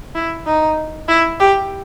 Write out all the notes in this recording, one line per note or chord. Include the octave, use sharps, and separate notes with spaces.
E4
D#4
E4
G4